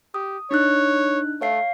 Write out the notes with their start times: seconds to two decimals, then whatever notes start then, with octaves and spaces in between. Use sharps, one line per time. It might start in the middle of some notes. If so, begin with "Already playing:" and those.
0.14 G4 D#6
0.51 D4 D#4 C#5 F#6
1.41 A3 C#5 F5 C7